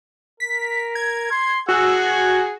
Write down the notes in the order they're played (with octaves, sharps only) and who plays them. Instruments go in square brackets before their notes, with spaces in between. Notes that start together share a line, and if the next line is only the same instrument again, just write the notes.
[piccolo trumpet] A#4 [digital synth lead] B6
[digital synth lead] G#6
[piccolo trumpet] C6
[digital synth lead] F#4 [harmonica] G#4 F#5 G#5 [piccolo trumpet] E6
[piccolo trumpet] G#6